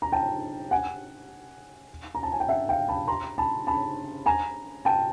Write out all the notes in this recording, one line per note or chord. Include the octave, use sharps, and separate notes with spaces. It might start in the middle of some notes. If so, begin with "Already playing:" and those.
A#5
G5 A5
F#5 G#5
A#5
A5
G#5
G5
E5 F#5
F5 G5
A5 B5
A#5 C6
A5 B5
A5 B5
G#5 A#5
G5 A5